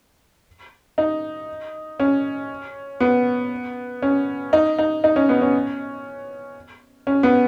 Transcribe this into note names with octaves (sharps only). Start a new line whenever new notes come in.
D#4
C#4
B3
C#4
D#4
D#4
D#4
C#4
B3
C#4
C#4
B3